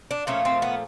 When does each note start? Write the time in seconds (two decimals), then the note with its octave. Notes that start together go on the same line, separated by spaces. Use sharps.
0.11 D4
0.27 A#2 F3 A3 C#4
0.45 C4
0.62 B3